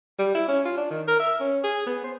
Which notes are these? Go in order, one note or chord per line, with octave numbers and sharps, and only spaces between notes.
G3
E4
C#4
F4
D4
D#3
A#4
E5
C#4
G#4
B3
C5